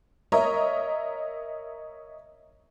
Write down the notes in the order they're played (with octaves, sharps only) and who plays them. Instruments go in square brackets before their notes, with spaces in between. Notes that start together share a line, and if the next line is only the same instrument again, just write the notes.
[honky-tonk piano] A#4 C#5 D#5 E5 A#5